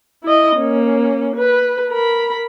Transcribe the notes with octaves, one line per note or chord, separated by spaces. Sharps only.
E4 D#5
A#3 C#4
B4
A#4 B5